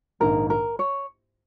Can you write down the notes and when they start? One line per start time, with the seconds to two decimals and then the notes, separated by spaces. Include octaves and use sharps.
0.20 A#1 G#2 D#3 A#3 D#4 A#4
0.50 A#4
0.79 C#5